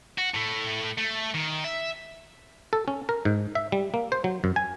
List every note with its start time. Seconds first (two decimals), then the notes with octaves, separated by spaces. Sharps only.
0.18 F#4
0.34 A2 A3
0.98 A3
1.34 D#3
1.64 E5
2.73 A4
2.88 C#4
3.09 A#4
3.25 G#2
3.55 E5
3.72 G3
3.94 A#3
4.12 C5
4.24 F#3
4.44 F#2
4.56 G#5